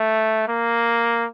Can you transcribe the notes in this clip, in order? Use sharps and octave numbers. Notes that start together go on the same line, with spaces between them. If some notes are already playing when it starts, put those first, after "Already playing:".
Already playing: A3
A#3